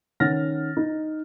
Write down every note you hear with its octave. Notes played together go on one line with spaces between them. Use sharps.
D#3 C#4 F#5 F6 A6 A#6
D#4